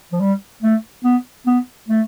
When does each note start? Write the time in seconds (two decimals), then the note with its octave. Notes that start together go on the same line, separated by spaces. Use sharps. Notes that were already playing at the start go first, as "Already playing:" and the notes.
0.12 F3
0.20 G3
0.62 A3
1.04 B3
1.46 B3
1.89 A3